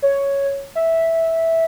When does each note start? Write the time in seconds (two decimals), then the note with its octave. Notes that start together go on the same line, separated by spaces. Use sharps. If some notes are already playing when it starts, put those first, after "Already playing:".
0.02 C#5
0.75 E5